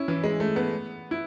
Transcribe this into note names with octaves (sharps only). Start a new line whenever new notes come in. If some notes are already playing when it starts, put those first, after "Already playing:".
Already playing: C#4 E4
E3
G#3
A3
B3
E4